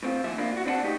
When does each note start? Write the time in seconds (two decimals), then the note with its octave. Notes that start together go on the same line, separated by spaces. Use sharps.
0.03 A2 C4 F4
0.23 D#2 F3 E5
0.38 A#3 D4 E4 F4
0.52 F4 F#4
0.66 C4 D4 B4 F#5 A5
0.84 A2 D#4 G4